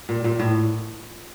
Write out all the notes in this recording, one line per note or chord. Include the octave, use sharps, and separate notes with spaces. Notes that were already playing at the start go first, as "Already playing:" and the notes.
A#2
A#2
A2